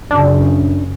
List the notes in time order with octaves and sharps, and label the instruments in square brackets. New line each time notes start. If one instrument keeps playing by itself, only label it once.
[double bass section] F#2 C#3 [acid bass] D4